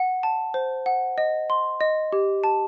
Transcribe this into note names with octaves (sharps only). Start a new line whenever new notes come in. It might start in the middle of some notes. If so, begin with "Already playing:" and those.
Already playing: F#5
A5
C5
F#5
D#5
C6
D#5
G4
A5